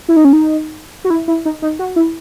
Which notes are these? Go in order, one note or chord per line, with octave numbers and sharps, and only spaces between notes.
E4
D#4
C#4
D#4
F#4
E4
E4
D#4
D#4
F#4
E4